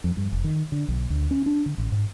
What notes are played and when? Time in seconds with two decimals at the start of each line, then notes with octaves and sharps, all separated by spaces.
0.04 F2
0.17 G2
0.33 F1
0.44 D#3
0.72 D3
0.88 B1
1.10 D2
1.31 C#4
1.46 D4
1.66 D3
1.78 A1
1.92 G#2